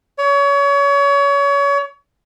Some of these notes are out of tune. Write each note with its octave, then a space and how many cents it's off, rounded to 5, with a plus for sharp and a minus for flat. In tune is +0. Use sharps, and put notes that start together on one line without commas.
C#5 +30